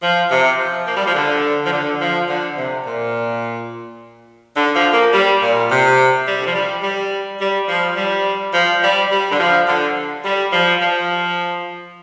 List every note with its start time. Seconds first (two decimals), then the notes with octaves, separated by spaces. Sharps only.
0.02 F3
0.30 C3
0.58 F3
0.86 A#3
0.96 G3
1.06 F3
1.15 D3
1.66 F3
1.72 D3
2.00 F3
2.29 D3
2.57 C3
2.86 A#2
4.56 D3
4.75 F3
4.93 A#3
5.13 G3
5.42 A#2
5.70 C3
6.26 G3
6.39 D3
6.47 F3
6.55 G3
6.83 G3
7.40 G3
7.68 F3
7.97 G3
8.54 F3
8.82 G3
9.10 G3
9.31 D3
9.39 F3
9.67 D3
10.24 G3
10.53 F3
10.81 F3